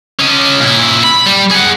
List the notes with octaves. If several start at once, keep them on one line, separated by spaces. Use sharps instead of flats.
C#4 D#5
A#2 E4
B5
G3
G#4 F#5